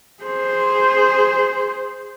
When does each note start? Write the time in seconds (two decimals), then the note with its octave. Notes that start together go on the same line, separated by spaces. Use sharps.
0.23 G#4 C5